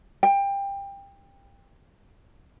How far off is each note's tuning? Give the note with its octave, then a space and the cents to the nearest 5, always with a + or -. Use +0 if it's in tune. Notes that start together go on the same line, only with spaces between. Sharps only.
G5 +20